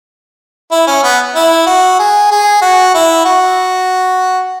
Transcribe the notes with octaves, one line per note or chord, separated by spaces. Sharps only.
E4
C#4
B3
E4
F#4
G#4
G#4
F#4
E4
F#4